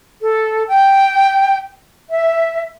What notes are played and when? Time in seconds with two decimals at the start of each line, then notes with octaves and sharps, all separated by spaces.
0.22 A4
0.68 G5
2.11 E5